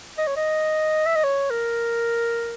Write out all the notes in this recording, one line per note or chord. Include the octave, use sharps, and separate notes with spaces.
D#5
C#5
D#5
E5
D#5
C#5
A#4